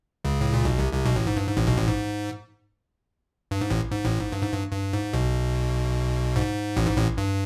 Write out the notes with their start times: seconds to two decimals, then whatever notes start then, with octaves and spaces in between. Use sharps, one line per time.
0.24 C#2 C#3
0.41 A2
0.53 A#2
0.65 B1 B2
0.78 C2 C3
0.93 C2 C3
1.05 B1 B2
1.16 A1 A2
1.27 G#2
1.36 G2
1.47 G#2
1.57 A1 A2
1.67 B1 B2
1.77 A1 A2
1.87 G#2
3.51 G2
3.61 G#2
3.70 A1 A2
3.91 G#2
4.05 A1 A2
4.19 G#2
4.32 G2
4.42 G#2
4.53 G2
4.72 G2
4.93 G#2
5.13 B1 B2
6.36 G#2
6.76 A1 A2
6.87 G#2
6.97 A1 A2
7.18 G2